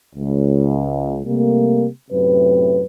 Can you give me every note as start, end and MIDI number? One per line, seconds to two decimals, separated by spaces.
0.16 1.19 37
1.25 1.87 48
1.25 1.87 55
1.25 1.87 57
1.25 1.87 58
2.11 2.85 42
2.11 2.85 45
2.11 2.85 48
2.11 2.85 71